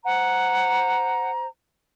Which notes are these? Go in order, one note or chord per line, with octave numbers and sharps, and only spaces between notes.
C5 F#5 A#5